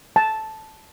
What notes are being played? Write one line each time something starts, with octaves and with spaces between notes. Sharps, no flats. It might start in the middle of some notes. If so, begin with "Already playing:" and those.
A5